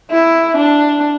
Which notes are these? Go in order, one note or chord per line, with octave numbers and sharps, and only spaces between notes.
E4
D4